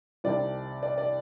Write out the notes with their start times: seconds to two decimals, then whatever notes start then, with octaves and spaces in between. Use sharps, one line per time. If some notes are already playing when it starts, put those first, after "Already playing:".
0.24 C2 C3 D#3 D5
0.83 D5
0.98 D5